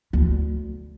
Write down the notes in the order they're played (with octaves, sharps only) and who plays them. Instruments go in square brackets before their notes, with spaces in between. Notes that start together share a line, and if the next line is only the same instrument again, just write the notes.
[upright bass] D2